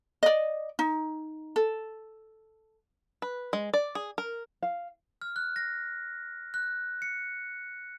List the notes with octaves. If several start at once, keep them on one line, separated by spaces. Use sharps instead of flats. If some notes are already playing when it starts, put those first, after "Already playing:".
D5 D#5
D#4
A4
B4
G#3
D5
G#4
A#4
F5
F6
F#6
A#6
F#6
C#7